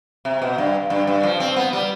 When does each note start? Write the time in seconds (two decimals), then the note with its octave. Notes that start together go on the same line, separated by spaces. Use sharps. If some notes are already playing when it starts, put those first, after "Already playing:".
0.25 C3
0.42 B2
0.58 G2
0.90 G2
1.07 G2
1.23 F3
1.40 C4
1.56 B3
1.73 G3